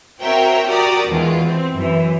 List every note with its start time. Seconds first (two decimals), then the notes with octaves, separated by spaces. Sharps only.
0.22 C4 F#4 A#4 C#5 E5 G5
0.68 F#4 G4 A#4 D5 A#5 D#6
1.09 E2 B2 D#3 G#3 F4
1.42 E3 C4
1.74 F#2 E3